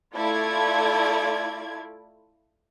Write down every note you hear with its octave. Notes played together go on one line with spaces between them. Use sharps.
A3 E4 F4 A4 D5 G#6